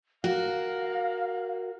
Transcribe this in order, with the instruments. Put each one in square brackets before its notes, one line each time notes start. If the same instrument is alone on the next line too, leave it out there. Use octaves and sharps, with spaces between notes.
[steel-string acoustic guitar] F#4 A#4 [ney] F5